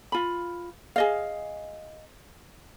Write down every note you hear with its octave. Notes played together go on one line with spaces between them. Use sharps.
F4 B5
G#4 D#5 F5